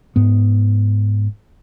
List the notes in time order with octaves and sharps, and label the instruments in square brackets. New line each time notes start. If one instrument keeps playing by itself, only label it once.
[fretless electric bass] G#2 B3